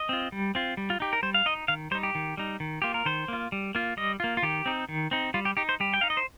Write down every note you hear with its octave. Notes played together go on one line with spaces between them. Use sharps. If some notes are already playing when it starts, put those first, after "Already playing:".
Already playing: D#5
C4 F4
G3
C4 F4
G3
F4
D#4 G4
A#4
G3 C5
F5
D#4 D#5
D#3 F5
G3 D#4 C5
G4
D#3
G3 D#4
D#3
A#3 F4 G4
A#4
D#3 C5
A#3 F4
G3
A#3 F4
G3 D#5
A#3 F4
F4
D#3 G4
C4 D#4
D#3
C4 D#4
G3 F4
G4
D#4 G4
C5
G3 G4
G5
D#4 F5
D#5
C5